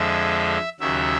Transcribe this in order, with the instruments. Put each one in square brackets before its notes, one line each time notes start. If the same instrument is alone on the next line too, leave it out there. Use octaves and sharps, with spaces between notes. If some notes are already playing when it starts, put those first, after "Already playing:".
Already playing: [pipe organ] F2 D3 F3 G#3 E5
D#2 C#3 F#3 E5